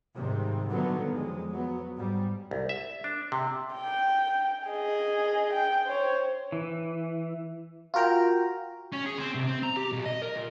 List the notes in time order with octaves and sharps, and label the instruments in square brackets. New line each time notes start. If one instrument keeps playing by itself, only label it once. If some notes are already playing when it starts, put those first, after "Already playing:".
[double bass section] G#2 C3 D#3 G3
A#2 D3 D#3 F#3 G3 B3
F2 G#3
F#3 B3
G#2 G3
[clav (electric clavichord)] C2
E5
D4
C3
[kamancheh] G5
G#4 D#5
G5
C5 C#5
[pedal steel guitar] E3
[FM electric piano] F4 F#4 A#4 G5 A#5
[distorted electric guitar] C#4
G#4
C4
C2
C4
A#5
G4
B1
D#5
A#4
A#2